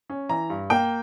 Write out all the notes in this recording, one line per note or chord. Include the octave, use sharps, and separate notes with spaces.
C#4
E3 A#5
G2
A#3 G5